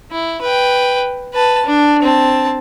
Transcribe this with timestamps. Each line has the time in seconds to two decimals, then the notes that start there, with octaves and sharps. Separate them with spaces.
0.12 E4
0.42 B4 G5
1.34 B4 A5
1.66 D4
2.02 C4 A5